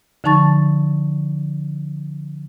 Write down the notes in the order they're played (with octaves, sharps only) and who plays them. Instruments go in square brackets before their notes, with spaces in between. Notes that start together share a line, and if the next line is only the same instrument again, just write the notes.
[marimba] D3 F3 D#4 A5 C#6 A6